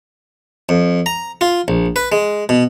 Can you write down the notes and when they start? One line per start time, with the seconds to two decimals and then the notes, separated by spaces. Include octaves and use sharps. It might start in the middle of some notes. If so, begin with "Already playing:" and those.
0.69 F2
1.06 A#5
1.41 F4
1.68 A#1
1.96 B4
2.12 G#3
2.49 B2